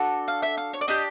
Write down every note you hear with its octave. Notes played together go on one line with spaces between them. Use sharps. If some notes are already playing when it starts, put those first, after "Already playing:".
Already playing: D4 F#4 A4
F5
E5
F5
C#5
D5
D4 G4 D#5